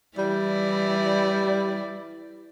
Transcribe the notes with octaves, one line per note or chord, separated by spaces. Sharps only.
E3 G3 E4 D5